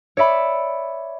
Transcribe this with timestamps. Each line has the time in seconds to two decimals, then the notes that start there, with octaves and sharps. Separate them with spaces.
0.17 C#5 D5 E5 B5